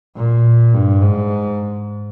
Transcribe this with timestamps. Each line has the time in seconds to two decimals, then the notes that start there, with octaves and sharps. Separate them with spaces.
0.17 A#2
0.74 G2
1.02 G#2